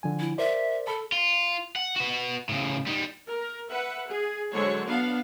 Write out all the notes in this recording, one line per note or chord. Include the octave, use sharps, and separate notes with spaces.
D3 F3 G#5
E4
A#4 C5 D5 E5
A4 A5 B5
F4
F#5
F#4 B4
A2 C#3
G3 D#4
A#4
B4 E5 F#5
G#4
D3 F#3 G#3 A4 C5 C#5
B3 D4 F5